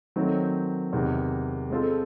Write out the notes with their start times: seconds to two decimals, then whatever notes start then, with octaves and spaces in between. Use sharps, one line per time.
0.16 D#3 F#3 A3 C4
0.93 E2 C3 D#3
1.70 G#3 C4 F4 A4